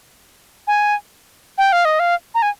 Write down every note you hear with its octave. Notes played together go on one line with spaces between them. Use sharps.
G#5
G5
F5
D#5
F5
A#5
G#5